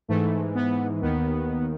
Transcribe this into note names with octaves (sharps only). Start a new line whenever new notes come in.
G#2 E3 A3
B3
D#2 D#3 B3